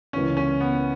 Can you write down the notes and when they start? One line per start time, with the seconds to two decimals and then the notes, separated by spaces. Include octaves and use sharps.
0.13 C#2 C#3 E3 A#3 C#4
0.37 C#4
0.61 B3